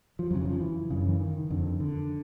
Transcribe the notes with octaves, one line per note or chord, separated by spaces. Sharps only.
F3
F2 C#3 F#3
E3
F3
E3
F#2 C#3
E3
D#3
F2 D3
D3